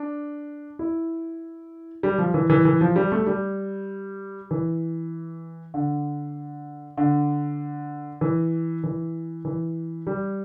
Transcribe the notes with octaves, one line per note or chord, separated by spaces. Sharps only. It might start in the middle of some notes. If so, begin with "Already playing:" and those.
Already playing: D4
E4
G3
F3
E3
E3
E3
F3
G3
A3
G3
E3
D3
D3
E3
E3
E3
G3